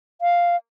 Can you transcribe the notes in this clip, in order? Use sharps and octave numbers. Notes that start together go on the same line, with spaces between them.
F5